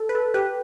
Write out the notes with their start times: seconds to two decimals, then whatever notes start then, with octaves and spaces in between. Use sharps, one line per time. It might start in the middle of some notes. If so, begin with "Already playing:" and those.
Already playing: A4
0.09 B4
0.15 A4
0.34 G4 B4